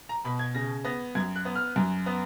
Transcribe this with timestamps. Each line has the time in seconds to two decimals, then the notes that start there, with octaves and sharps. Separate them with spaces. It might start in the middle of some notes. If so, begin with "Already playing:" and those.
0.09 A#5
0.25 B2 B5
0.39 G#6
0.55 C#3 A#6
0.84 B3 A#6
1.15 F#2 G#6
1.36 F#6
1.45 B3
1.55 F6
1.76 F#2
2.06 B3